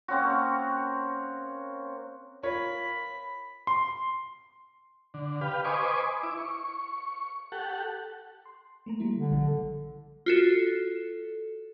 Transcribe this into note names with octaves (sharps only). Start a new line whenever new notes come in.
A#3 C4 C#4 F#4
F4 A#4 C#5 B5
C6
D3
G4 B4 F5
B4 C5 D#5 G#5 C#6 D6
E4 D6
C#6
G4 A4 F#5
C6
A3 A#3 A#5
F#3 G3 E4
D3
A#1 C#3 F3
F4 F#4 A4